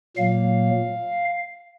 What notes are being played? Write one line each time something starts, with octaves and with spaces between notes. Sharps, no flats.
A#2 F#3 A#3 F5